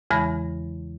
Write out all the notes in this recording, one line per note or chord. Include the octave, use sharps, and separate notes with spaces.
E2 C#3 E3 G#3 B5 A#6